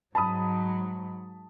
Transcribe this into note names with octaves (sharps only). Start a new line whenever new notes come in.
G#2 F#3 A5 B5 D#6